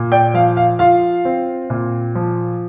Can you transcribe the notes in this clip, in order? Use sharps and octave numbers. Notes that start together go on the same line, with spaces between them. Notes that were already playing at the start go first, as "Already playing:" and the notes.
Already playing: A#2
D5 G5
F3 F5
F5
F4 F5
C4
A#2
F3